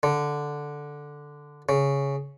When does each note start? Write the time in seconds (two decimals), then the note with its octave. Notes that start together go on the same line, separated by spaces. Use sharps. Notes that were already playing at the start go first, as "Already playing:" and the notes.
0.03 D3
1.69 C#3